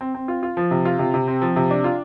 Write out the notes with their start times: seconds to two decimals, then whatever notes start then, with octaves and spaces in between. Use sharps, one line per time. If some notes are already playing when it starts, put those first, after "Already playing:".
0.01 C4
0.15 C4
0.28 F4
0.43 F4
0.57 F3
0.71 C3
0.85 F4
0.99 C3
1.14 C3
1.28 C4
1.42 F3
1.56 C3
1.71 D4
1.84 F4